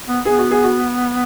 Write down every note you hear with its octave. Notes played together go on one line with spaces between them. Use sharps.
B3
B3 G#4
F#4
G#4
F#4